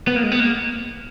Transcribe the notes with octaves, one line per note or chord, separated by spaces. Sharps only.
B3
A#3
G#3
B3
A#3